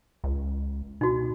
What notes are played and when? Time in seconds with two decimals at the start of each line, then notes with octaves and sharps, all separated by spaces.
0.24 C#2
1.01 B2 D#4 F#4